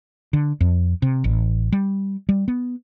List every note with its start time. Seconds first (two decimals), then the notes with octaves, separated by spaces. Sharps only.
0.33 D3
0.61 F2
1.02 C3
1.24 A1
1.72 G3
2.29 G3
2.48 B3